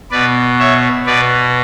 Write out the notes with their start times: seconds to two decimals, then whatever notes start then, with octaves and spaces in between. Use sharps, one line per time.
0.11 B2 B4 D5
0.59 C#5 E5
1.06 B2 B4 D5